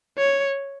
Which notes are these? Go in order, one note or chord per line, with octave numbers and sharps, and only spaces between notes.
C#5